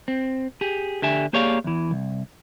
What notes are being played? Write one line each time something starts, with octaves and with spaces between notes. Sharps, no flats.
C4
G4 G#4
D3 G4 E5 G#5
A#3 G4 G#4 C#5 D5 F5
E2 E3
C2